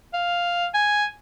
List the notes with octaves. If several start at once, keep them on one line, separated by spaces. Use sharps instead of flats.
F5
G#5